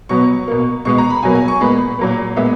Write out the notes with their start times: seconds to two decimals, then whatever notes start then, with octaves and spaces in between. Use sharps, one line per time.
0.09 B2 F#3 B3 C#6
0.48 B2 A#3
0.85 B2 G#3 B3 C#6
0.98 A#5
1.10 B5
1.23 B2 F#3 A#3 G#5
1.35 G#5
1.48 C#6
1.61 A#2 G#3 B3 B5
1.99 A#2 F#3 A#3
2.36 A#2 G#3 B3 E5